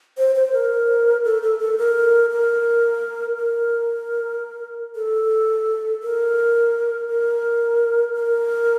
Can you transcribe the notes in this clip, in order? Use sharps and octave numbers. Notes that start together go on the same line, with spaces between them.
C5
C5
A#4
A4
A4
A4
A#4
A#4
A#4
A4
A#4
A#4
A#4